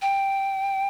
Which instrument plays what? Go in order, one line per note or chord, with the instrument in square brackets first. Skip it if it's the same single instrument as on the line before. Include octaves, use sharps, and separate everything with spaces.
[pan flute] G5